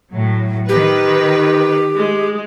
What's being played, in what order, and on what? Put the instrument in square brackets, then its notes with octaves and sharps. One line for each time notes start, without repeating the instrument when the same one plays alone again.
[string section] A2 F#3
[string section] D#3 B4 [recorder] G4
[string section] G#3